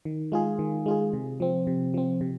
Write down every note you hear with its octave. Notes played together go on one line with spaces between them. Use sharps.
D#3
G#3 F4 G#4
D#3
G#3 F4 G#4
C3
F3 C4
C3
F3 C4
C3